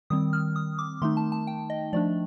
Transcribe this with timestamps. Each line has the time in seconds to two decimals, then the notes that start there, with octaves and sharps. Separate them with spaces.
0.10 D#3 G3 C4 D#6
0.33 F6
0.56 D#6
0.79 D6
1.02 D#3 A3 D#4 C6
1.17 A5
1.32 A5
1.47 G5
1.70 D#5
1.93 F3 A3 D4 D5